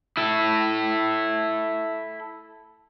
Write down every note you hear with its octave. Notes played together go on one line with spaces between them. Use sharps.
E4 A4